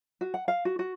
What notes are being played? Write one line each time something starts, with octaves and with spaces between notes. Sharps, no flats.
F#4
F#5
F5
F#4
F#4